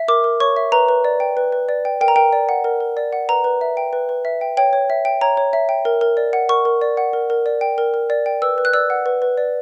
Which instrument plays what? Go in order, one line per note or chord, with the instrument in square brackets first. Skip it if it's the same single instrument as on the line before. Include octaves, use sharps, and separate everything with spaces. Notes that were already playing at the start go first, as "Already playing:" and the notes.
Already playing: [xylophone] E5
A#4 D6
A#4
C#5 C#6
E5
B4 A#5
B4
D5
G5
B4
B4
D5
G5
A#4 G5
A#5
A#4 G5
D5
F#5
A#4
A#4
D5
F#5
B4 A#5
B4
E5
G5
B4
B4
E5
G5
C#5 G5
C#5
E5
G5
C#5 A#5
C#5
E5
G5
A#4
A#4
D5
F#5
A#4 C#6
A#4
D5
F#5
A#4
A#4
D5
G5
A#4
A#4
D5
G5
B4 E6
B4
F#6
D5 E6
F#5
B4
B4
D5